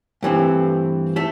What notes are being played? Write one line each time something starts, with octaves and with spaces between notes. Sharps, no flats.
G2 E3 A3 C4
A3 A4